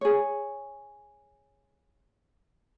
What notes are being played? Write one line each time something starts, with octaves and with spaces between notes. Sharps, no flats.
G#4 C#5